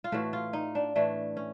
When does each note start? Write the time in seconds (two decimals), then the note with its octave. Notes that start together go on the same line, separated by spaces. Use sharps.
0.04 F4
0.12 A2 E3 A3 F#4
0.33 F4
0.53 D#4
0.75 D4
0.96 A2 E3 A3 D4
1.37 C#4